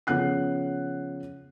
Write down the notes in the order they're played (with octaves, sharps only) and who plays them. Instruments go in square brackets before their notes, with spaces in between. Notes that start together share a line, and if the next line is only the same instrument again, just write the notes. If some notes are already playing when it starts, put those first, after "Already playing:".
[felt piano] C#3 F3 B3 F#5 F#6 C7